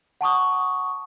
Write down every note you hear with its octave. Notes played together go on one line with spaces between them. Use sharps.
F#5 A5 C#6 D#6